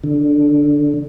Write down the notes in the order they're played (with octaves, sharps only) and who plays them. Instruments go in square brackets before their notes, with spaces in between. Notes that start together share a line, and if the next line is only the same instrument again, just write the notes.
[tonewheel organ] D3